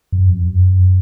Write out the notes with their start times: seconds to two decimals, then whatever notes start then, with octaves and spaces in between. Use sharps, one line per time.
0.12 F#2
0.29 F2
0.47 F#2